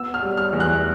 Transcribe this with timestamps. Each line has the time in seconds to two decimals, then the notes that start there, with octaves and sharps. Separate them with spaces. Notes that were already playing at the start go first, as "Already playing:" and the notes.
Already playing: B3 E6
0.14 F6
0.22 G3
0.37 F6
0.53 E2
0.60 F#6